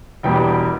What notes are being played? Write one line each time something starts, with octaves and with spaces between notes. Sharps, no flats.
E1 E2 B2 G3 G5